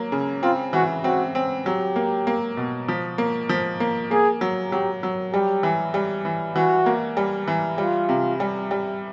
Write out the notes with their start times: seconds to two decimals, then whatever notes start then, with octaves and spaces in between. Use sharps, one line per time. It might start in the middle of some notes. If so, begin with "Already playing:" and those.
Already playing: F#3 A#3
0.12 C#3
0.43 C4 F4
0.73 E3 F#4
1.04 C4 F#4
1.35 C4
1.66 F#3 G4
1.96 A#3
2.27 A#3
2.57 B2
2.88 F3
3.18 A#3
3.49 F3
3.80 A#3
4.11 A#3 G#4
4.41 F#3
4.71 F#3 G4
5.03 F#3
5.33 G3 G4
5.63 E3
5.94 G3
6.25 E3
6.55 E3 F#4
6.86 A#3
7.17 G3
7.47 E3
7.78 G3 F4
8.09 C3
8.40 G3
8.71 G3